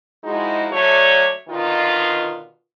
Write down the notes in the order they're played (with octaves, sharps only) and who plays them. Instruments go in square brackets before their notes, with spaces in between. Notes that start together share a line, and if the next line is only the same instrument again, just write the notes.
[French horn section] F3 G#3 D#4 E4 F#4
D3 F#3 A3 C#5 D5
B2 D3 D#3 F4